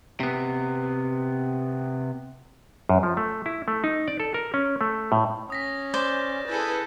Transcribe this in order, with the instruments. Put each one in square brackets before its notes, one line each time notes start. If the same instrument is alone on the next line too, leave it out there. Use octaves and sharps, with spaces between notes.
[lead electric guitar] C3 B3
[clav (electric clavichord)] F#2
F3
A3
E4
A3
D#4
D5
A4
A#4
C#4
A3
A2
[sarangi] C#4 [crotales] D#6 A#6 B6
[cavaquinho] C5 D5 [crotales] G6 E7
[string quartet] E4 G#4 A4 [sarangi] B4 [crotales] A6